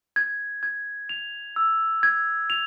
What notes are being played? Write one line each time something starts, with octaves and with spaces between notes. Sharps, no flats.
G#6
G#6
F7
E6
G#6
F7